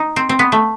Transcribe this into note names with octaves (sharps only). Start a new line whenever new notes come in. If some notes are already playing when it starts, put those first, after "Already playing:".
Already playing: D#4
C4
C4
B3
A3